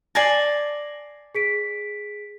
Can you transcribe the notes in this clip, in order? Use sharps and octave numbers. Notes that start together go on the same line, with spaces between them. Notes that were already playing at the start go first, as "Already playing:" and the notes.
D5 G#5 A5 A#6 C7 F#7
G#4 B6 D7